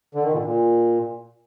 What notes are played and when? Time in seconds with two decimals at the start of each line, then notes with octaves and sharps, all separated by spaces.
0.15 D3
0.24 D#3
0.33 A#2 D3
0.45 A#2